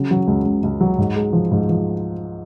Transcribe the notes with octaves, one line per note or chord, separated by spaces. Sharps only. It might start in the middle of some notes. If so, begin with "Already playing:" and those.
Already playing: C#3 F#3
F#3
C#2
C#2
C#2
F#3
G#2
G#3
F3
G#2
F3